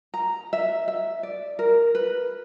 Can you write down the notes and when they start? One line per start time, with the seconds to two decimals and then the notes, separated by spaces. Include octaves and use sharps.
0.14 A#5
0.53 E5
0.88 E5
1.23 D5
1.59 A#4
1.95 B4